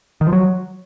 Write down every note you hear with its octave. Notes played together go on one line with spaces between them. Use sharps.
D#3
F3
F#3